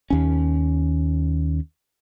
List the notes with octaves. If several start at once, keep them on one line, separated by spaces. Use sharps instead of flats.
D#2 C#4